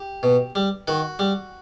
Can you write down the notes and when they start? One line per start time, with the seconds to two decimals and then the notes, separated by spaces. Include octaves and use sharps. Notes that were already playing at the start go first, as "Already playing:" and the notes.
Already playing: G4
0.23 B2
0.55 G3
0.88 D#3 F#4
1.19 G3